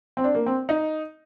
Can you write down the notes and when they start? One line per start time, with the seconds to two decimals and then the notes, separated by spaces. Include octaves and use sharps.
0.17 C4
0.24 D4
0.35 A#3
0.46 C4
0.69 D#4